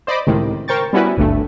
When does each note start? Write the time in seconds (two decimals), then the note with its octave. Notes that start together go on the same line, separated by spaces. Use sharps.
0.07 C5 D5 D#5 B5 D6
0.27 C#2 A2 C3 D#3
0.68 A#4 C5 G5 C#6 A6
0.93 G3 B3 C#4 E4 F#4 B4
1.17 G#1 D2 G2 A3